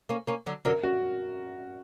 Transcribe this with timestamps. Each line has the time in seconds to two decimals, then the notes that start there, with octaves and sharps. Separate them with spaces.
0.09 A#3 C#4
0.27 A#3 C#4
0.46 D3 F#3
0.65 D3 F#3 A#4
0.83 F#4